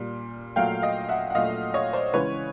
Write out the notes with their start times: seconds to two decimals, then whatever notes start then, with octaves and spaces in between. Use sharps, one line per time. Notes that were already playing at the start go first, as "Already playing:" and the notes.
Already playing: A#2 G3
0.56 A#2 F#3 A3 F5 G5
0.82 D#5 F5
1.09 E5 F#5
1.30 F#5
1.35 A#2 F#3 A3 D#5 F5
1.74 C#5 D#5
1.93 C5 D5
2.13 C#3 E3 G#3 B4 C#5